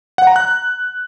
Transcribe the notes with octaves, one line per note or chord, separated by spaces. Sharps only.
F#5
A#5
F#6